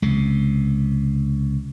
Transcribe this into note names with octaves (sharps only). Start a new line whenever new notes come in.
C#2 C3